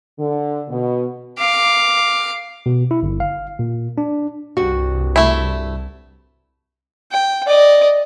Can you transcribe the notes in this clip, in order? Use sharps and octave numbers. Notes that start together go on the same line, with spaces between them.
D3
B2
F5 D6
B2
E4
G1
F5
A#2
D4
C2 G2 F#4
A3 E4
G5
D5 D#5